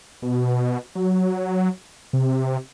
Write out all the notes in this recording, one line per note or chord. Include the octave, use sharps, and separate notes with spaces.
B2
F#3
C3